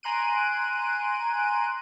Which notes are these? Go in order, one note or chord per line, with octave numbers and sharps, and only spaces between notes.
G#5 A#5 C6 F#6 D7 D#7